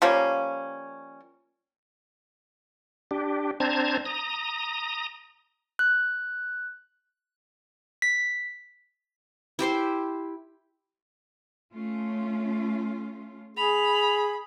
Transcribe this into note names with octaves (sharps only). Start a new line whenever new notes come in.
F3 G3 A#3 C#4
D4 G4
C4 D4 C5 A5 A#5 G#6
A#5 D#6
F#6
B6
E4 G4 C5 C6
A3 C#4 F4
G#4 B5 F7